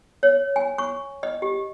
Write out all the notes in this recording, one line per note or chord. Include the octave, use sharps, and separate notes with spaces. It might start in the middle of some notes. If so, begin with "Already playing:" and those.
C#5
G#5
C#6
D#5
G4